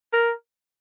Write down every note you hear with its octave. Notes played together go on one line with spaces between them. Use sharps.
A#4